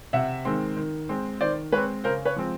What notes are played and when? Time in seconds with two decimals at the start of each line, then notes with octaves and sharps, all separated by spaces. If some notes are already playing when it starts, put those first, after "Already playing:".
0.13 C3 E5 F#5
0.45 D#3 G#3 C4
0.76 D#3
1.09 G#3 C4
1.41 D#3 C5 D5
1.72 G#3 C4 B4 C#5
2.04 C#3 A#4 C5
2.25 B4 C#5
2.36 F3 G#3 C4